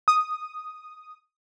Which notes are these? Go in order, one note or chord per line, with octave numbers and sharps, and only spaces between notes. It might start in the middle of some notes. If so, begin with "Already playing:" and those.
D#6